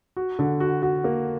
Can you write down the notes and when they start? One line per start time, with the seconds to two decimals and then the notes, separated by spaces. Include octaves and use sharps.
0.17 F#4
0.39 D3
0.60 F#4
0.82 F#4
1.04 A#3